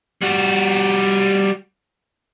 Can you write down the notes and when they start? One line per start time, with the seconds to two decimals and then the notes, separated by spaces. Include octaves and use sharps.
0.22 G3 F#4